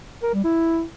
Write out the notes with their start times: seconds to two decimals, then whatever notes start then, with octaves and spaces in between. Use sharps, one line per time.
0.23 A#4
0.33 G3
0.44 E4